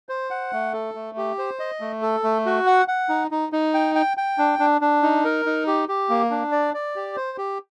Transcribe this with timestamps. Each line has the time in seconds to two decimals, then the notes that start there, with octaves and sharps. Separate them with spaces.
0.09 C5
0.31 F#5
0.53 A3
0.73 A4
0.95 A3
1.17 G4
1.38 C5
1.59 D#5
1.80 A3
2.02 A4
2.24 A3
2.46 F#4
2.67 F#5
2.88 F#5
3.09 D#4
3.31 D#4
3.53 D#4
3.74 G5
3.95 G5
4.17 G5
4.38 D4
4.59 D4
4.81 D4
5.02 D#4
5.25 A#4
5.46 D#4
5.67 G4
5.88 G4
6.09 A#3
6.30 D4
6.52 D5
6.74 D5
6.96 G4
7.16 C5
7.38 G4